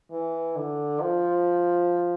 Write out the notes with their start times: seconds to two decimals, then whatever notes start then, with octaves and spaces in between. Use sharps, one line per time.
0.11 E3
0.56 D3
1.01 F3